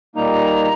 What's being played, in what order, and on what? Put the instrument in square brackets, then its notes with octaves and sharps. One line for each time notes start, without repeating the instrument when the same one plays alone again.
[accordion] A#2 G3 A#3 D#4 [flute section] A#5